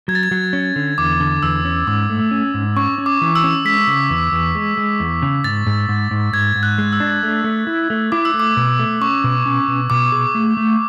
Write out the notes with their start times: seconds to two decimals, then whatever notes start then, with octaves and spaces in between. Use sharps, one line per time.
0.08 F#3 G#6
0.15 A6
0.23 G#6
0.31 F#3
0.53 C#4
0.76 D3
0.98 E2 D6
1.20 D3
1.43 E2 E6
1.65 C#4
1.87 G#2 D6
2.10 A3
2.31 C#4
2.54 G#2
2.76 C#4 C#6
2.98 C#4
3.06 D6
3.21 E3
3.35 E6
3.44 C#4
3.65 G#3 B6
3.87 C#3
4.10 E2
4.32 E2
4.55 G#3
4.77 G#3
5.00 E2
5.22 C#3
5.44 G#2 A6
5.66 G#2
5.89 G#2
6.11 G#2
6.33 G#2 G#6
6.55 G#2
6.63 F#6
6.78 G#3
6.93 E6
7.00 D4
7.23 A3
7.44 A3
7.67 E4
7.90 A3
8.12 E4 D6
8.25 E6
8.34 A3
8.40 D6
8.57 B2
8.79 A3
9.01 C#4 C#6
9.24 B2
9.46 C#4
9.68 B2
9.90 B2 D6
10.12 G#4
10.35 A3
10.57 A3